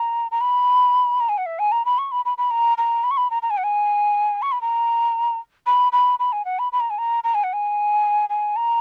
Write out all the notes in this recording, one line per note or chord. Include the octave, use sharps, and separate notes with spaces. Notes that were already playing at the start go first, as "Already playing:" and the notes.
Already playing: A#5
A#5
B5
A#5
G#5
F#5
E5
G#5
A#5
B5
C#6
B5
B5
B5
A#5
A#5
B5
C#6
B5
A#5
A#5
G#5
F#5
G#5
C#6
B5
A#5
B5
B5
B5
G#5
F#5
B5
B5
A#5
G#5
A#5
A#5
G#5
F#5
G#5
G#5
A#5